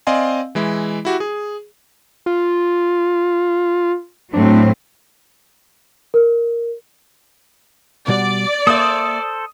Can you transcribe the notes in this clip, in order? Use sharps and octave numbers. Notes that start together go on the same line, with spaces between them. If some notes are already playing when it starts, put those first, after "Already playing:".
C4 D5 D#5 F5 G#5 C6
E3 G#3 E4
E4 F#4 G4
G#4
F4
A2 F#3 C4 D4
A#4
B2 G3 F#4 D5
A#3 A4 C5 E5 D#6